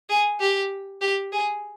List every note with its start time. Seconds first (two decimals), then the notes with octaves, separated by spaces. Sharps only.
0.09 G#4
0.40 G4
1.01 G4
1.32 G#4